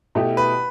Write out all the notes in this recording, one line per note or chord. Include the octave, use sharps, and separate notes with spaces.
B2 A3 E4 G4
B4